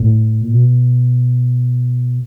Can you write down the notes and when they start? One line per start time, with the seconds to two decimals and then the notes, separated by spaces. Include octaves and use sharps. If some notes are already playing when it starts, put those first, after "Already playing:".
Already playing: A2
0.41 A#2
0.52 B2